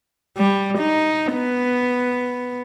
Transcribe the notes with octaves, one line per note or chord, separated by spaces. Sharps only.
G3
D#4
B3